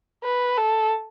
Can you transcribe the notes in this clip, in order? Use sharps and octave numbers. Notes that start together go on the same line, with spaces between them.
B4
A4